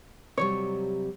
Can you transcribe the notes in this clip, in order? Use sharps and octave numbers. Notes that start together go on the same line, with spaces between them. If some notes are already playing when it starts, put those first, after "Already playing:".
C3 F#3 G3 C#5